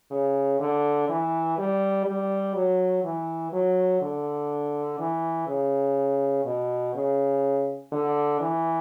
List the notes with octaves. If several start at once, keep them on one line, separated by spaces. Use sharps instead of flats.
C#3
D3
E3
G3
G3
F#3
E3
F#3
D3
E3
C#3
B2
C#3
D3
E3